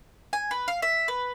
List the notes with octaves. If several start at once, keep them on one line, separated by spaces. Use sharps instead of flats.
G#5
B4
F5
E5
B4